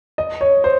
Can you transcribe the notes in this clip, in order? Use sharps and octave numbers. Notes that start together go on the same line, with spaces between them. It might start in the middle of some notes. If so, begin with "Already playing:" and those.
D#5
C#5
C5